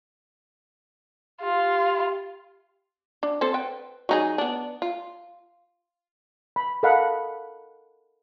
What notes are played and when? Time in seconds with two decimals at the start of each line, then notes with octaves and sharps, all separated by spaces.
1.43 F4 G4
3.23 D4
3.41 C4 A4 C5
3.54 B4 G5
4.09 F#3 D#4 G#4
4.38 B3 D4
4.82 F4
6.56 B5
6.83 A4 A#4 D#5 F5 F#5 B5